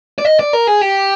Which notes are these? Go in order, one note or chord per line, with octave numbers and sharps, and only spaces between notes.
D5
D#5
D5
A#4
G#4
G4